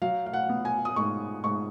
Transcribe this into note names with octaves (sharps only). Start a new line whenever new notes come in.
F#3 F5
F5
F#5
B3
G#5
D#6
G#2 C#6
G#2 C#6